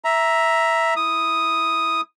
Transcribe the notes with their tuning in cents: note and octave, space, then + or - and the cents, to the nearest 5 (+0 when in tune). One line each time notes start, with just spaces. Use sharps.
E5 +0 A#5 +10
E4 +0 D#6 +0